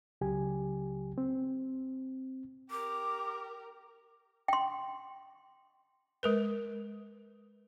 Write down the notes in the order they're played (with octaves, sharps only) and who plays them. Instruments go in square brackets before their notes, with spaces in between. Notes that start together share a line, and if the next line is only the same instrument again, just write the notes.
[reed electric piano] C#2 C#3 F#3 G4 G#5
C4
[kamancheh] G4 A#4 [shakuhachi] D6
[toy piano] G5 C6
[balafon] G#3 A#4 B4